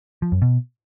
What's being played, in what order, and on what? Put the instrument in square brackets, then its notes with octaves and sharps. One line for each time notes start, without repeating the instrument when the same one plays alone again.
[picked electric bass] F3
F#2
B2